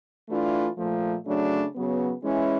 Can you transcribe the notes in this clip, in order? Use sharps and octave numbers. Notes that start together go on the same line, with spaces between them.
E3 A3 D4 F4
A#2 F3 A3
C#3 F#3 A3 D4
C#3 F#3 B3
E3 G#3 C#4 E4